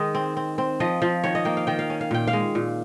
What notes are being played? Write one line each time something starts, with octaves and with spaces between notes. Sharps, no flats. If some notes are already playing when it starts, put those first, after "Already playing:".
Already playing: D#3 G#3 D#5
C4
C4
C4
F3 D#5
F3
D#3 C#5
D#5
A#3 G5
F5
D#3 G5
F5
C#4
F5
A#2 G5
F5
G#3
A#2